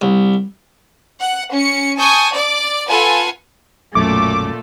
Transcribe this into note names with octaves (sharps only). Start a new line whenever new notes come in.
C2
F#5
C#4 C#7
G#5 A5 C#6 D#6 G6
D5 D6
F4 A4 B4 F#5 G#5
B1 F#2 A#2 A3 D6